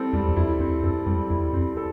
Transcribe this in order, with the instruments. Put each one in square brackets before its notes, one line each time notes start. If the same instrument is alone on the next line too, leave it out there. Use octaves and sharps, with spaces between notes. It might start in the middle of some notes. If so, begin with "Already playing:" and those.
Already playing: [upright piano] G3 C4 E4 A4
[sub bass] E2 [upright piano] G3
[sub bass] E2
[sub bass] F2 [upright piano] E4
[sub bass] E2 [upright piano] C4
[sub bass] F2 [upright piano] A4
[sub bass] F2 [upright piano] G3
[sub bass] E2 [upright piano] E4
[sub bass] F2 [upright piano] C4
[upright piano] A4